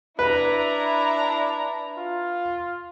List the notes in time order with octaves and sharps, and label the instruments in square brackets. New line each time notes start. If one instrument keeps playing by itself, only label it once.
[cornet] D4 [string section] E4 A#5 [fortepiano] B4
[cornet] F4